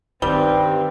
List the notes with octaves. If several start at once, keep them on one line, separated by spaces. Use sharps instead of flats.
G2 D#3 G3 C4